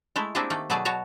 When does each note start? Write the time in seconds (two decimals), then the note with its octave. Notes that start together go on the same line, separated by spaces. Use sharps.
0.16 G#3 A3 E4
0.35 A#3 C4 D4 E4 G4 G#4
0.50 D#3 A3 A#3
0.70 B2 F#3 A3 G#4 D5 A5
0.85 B2 F#4 C#5 A5 A#5